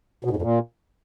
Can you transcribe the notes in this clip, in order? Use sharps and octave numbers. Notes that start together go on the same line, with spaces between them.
B2
G#2
F2
A#2